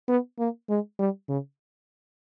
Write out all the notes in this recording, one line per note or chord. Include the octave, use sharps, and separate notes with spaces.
B3
A#3
G#3
G3
C#3